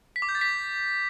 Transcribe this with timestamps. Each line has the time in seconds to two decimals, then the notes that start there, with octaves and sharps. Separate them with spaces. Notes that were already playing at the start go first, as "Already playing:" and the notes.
0.16 B6
0.22 D6
0.29 G6
0.35 A6
0.41 B6